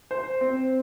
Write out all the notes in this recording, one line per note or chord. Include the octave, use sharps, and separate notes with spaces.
C5
C4